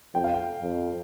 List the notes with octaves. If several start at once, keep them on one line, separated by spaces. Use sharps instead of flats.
F2 G5
F5
G5
F2